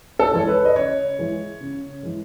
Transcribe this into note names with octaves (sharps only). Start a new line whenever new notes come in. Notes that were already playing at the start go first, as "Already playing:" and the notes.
A4
E3 G#3 C#5
B4
D#5
C#3 C#5
E3 G#3
C#3
E3 G#3